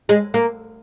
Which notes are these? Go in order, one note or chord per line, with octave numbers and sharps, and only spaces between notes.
G#3
A#3